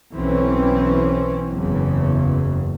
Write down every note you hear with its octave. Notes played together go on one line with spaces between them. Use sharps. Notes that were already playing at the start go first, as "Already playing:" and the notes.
B1 E3 C4 C#4
F#1 E2 C#3